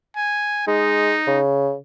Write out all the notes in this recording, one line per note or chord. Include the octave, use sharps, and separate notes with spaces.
G#5
G#3 D#4
C#3